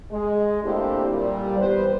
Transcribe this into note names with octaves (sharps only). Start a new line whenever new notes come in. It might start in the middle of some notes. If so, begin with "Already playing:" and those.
G#3
A3 A#3 C4 D4 E4 G4
A#2 G3
E3 G3 B3 B4 C5